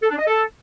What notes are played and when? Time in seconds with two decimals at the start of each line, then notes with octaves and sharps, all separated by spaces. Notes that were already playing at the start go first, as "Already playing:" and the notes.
0.02 A4
0.10 D4
0.19 D#5
0.27 A4